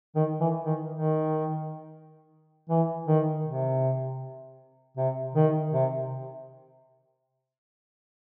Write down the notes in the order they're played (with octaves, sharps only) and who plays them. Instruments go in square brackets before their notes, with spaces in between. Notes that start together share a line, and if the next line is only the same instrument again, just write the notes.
[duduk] D#3
E3
D#3
D#3
E3
D#3
C3
C3
D#3
C3